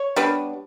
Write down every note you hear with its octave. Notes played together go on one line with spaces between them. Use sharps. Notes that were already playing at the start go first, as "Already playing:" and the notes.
Already playing: C#5
G3 B3 D4